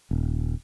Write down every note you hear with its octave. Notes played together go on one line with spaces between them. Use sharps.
D#1